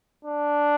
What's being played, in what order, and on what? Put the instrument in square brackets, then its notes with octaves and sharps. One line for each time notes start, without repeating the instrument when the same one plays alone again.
[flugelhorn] D4